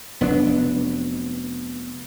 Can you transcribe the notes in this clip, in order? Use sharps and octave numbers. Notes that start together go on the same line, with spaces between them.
F1 F#3 B3 D4